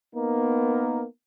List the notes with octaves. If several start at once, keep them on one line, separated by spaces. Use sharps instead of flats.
A#3 B3 D#4 A#4